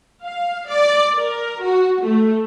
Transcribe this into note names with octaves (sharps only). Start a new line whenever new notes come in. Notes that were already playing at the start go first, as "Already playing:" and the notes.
F5
D5
A#4
F#4
A3